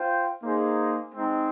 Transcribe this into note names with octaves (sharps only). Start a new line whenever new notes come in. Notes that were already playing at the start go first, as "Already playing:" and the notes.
Already playing: F4 C5 G5
A#3 D#4 G#4 C5
G#3 C4 D#4